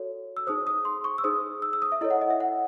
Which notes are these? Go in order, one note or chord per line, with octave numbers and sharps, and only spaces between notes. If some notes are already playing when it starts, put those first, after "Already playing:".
Already playing: F#4 A4 C#5
E6
D#4 G#4 C5 D#6
D#6
C6
C#6
E6
D#4 G#4 C5 D#6
E6
E6
D#6
E5
E4 A4 C#5 D#5
F#5
D#5
E5
F#5